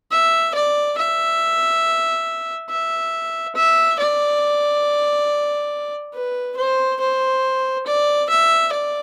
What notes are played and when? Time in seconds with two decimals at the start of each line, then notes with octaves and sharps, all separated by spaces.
0.11 E5
0.54 D5
0.98 E5
2.70 E5
3.55 E5
3.99 D5
6.14 B4
6.57 C5
7.00 C5
7.86 D5
8.30 E5
8.72 D5